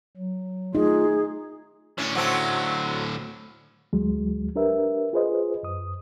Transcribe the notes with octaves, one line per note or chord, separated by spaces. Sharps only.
F#3
A3 D#4 F4 G#4
A2 D3 C#4
F#3 A3 C4
D2 F#3 G#3
D4 G4 A#4 B4 E5
F4 G#4 B4 C5 D#5
F#2 D#6